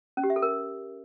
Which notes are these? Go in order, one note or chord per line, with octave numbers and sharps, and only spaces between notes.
C#4
G4
E5
A4
A#4